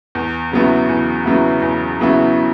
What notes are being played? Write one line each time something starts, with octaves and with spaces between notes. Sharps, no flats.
E2
C#3 F#3 B3 E4
E2
C#3 F#3 B3 E4
E2
C#3 F#3 B3 E4